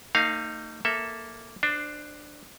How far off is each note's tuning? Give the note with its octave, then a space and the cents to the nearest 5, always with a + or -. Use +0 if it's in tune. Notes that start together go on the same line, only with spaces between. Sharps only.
A#3 -45 D#4 +0 F5 +0
A#3 +0 A4 +0 E5 +0
D4 +15 C5 -5